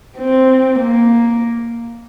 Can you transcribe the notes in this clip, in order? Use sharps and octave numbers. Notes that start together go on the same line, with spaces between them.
C4
A#3